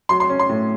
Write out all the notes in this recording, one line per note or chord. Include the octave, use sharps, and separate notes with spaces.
F#3 C6
C6
C#4
C6
A2